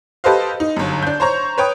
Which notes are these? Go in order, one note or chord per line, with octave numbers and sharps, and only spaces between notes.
G4 A4 B4 C5 D#5 F5
D#4
G1 F#2
D4 G6
C5 C#5 A#5 C#6
B4 C#5 G5 D#6